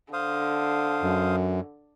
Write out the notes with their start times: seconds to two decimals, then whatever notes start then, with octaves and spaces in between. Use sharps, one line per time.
0.13 D3 C5 F5 D#6
1.03 F#2